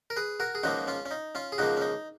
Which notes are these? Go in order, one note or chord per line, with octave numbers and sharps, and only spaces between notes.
A#4
G#4 B4
F#4 A#4
G#4
C#2 C#3 F3 A#3 D#4 F#4
C#4 F4
C#4
D#4
C#4 F4
G#4
C#2 C#3 F3 A#3 D#4 F#4
C#4
D#4